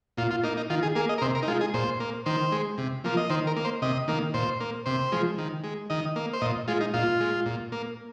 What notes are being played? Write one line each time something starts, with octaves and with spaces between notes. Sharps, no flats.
A#2 F4
F4
A#3 D#4
D#4
D#3 F4
G#4
A#3 G#4
D#5
A#4
C3 C5
A#4
D#4
G#3 F4
G#4
A#2 C5
A#3
D#3 C5
G#3
C3
F3 A#3
D#5
D#3 C5
A#4
A#3
C5
C3 D#5
D#3 A#3
A#2 C5
A#3
C3 C5
F3 G#3
D#3
G#3
D#3 D#5
A#3
C5
A#2 D#5
G#3 F4
D#4
A#2 F4
G#3
A#2
A#3